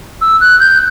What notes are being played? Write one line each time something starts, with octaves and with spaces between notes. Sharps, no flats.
E6
F#6
G6